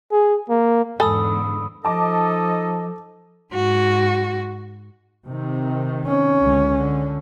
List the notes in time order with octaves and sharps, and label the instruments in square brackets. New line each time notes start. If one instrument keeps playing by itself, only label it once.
[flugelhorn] G#4
A#3
[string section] E2 G#2 D3 [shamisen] A4 G#5 [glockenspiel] B5 D#6 E6
[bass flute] F3 [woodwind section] D#4 D#5 [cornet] A4 [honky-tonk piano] A5 D6
[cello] G#2 F#4
[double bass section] C3 D#3
[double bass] C#4
[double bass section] C#2 D3
D3